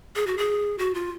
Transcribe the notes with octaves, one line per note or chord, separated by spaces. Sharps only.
G#4
F#4
G#4
F#4
F4